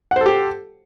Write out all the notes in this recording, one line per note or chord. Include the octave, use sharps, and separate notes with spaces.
G4 A4 C5 F#5